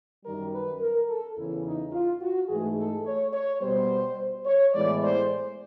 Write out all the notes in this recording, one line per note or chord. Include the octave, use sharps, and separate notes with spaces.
F#2 D#3 G3 A#4
B4
A#4
A4
E2 C#3 E3 E4
D#4
F4
F#4
G#2 E3 A3 G#4
A4
C#5
C#5
B2 G3 B3 C5
C#5
A2 E3 G#3 B3 D5
C5